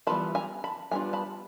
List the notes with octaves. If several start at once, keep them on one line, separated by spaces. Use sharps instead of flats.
E3 G3 B3 D4 F4 A5 B5
G#5 A#5
A5 B5
E3 G3 B3 D4 F4 G#5 A#5
A5 B5